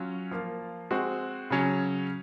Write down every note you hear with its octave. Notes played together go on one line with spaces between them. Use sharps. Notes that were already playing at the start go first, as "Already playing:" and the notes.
Already playing: F#3 C#4 F4
F3 A#3 F4
G#3 C4 F#4
C#3 F#3 C#4